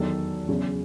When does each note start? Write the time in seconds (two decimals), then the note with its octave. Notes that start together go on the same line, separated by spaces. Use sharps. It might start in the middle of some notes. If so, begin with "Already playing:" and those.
Already playing: E2 D#3 F#3 A4
0.49 E2 C#3 F#3